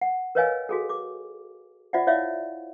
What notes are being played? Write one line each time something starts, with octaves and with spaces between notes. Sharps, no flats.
F#5
A#4 B4 C#5 D#5 F5 G#5
F#4 G#4 A4
D6
F4 C5 D5 E5 F#5
E4 C#5 D5 E5 F5